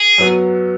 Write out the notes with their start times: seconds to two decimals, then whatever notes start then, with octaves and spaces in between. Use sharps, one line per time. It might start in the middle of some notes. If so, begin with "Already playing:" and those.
Already playing: G#4
0.18 F#2 F#3 B3 F#4